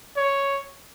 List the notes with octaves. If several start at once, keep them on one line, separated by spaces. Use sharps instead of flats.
C#5